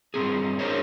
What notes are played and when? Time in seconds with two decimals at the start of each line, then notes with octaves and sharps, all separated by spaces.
0.14 G2 B2 C4 G#4
0.59 D4 F#4 G#4 A#4 C5 C#5